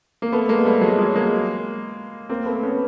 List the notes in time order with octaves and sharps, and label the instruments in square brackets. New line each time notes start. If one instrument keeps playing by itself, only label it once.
[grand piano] A#3
A3 B3
G#3 A#3
G3 A3
F#3 G#3
F#3 G#3
G#3 A#3
A#3 C4
A3 B3
B3 C#4